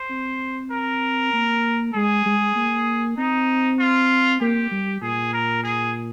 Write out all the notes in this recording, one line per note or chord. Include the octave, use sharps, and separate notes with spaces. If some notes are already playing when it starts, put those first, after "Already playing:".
Already playing: C5
C4
A#4
A#3
G#3 G#4
G#3
A#3
C4 D#4
F4
A#3 G4
G3
A#2 G#4
A#4
G#4